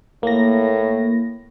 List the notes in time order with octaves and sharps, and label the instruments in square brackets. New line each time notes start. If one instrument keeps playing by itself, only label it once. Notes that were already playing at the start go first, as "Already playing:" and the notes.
[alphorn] A2 [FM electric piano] A#3 A#6